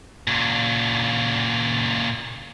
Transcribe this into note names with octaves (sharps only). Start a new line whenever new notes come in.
A#2 C#3